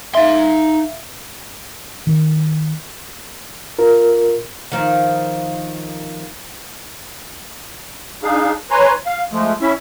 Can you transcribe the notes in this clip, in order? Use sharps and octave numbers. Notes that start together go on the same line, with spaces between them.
D#4 E5 F5 C6
D#3
F4 A#4
D#3 F3
D4 D#4 G#4 F5
B4 C#5 G#5 A#5 C6
F5
F3 G#3 A3
C#4 E4 E5